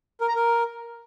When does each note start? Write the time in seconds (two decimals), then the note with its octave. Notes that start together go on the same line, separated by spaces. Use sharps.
0.21 A#4
0.28 A#5
0.36 A#4